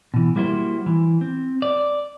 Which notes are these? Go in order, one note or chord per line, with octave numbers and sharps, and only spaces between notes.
B2 E3
G3 A#3 E4 F#4 C5
E3
C4
D5